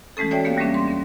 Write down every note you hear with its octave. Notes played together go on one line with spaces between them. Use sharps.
E3 G#3 A3 C#4 A4
F#4 A4 C#5 D5 E5 G5
G#3 A#3 B3 G4 E5 F5
D#2 G3 G#3 A#3 C#4 D4
C6
B3 C#4